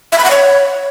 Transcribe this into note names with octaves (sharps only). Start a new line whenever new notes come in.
E5
B5
F#5
C#5